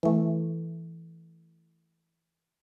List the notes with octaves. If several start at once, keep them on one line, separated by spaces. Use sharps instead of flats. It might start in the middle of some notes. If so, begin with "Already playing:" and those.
E3 A3